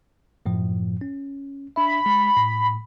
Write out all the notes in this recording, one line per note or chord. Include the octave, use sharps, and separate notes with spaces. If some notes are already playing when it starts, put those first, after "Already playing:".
F#2 A2 F3
C#4
D4 E5 B5
G#3
A2